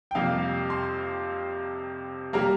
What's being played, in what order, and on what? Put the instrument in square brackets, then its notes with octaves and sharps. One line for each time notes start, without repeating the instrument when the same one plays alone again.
[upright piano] G5
F2 C3 G3 A#3 F5
C6
G3 A#3 A#5